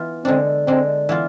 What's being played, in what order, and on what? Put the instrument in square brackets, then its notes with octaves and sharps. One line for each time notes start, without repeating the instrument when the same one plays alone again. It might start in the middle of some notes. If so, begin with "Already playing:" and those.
Already playing: [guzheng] E3 B3 F4
[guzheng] D3 G#3 D4 [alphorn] C4
[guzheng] D3 G#3 D4 [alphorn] C4
[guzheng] E3 B3 F4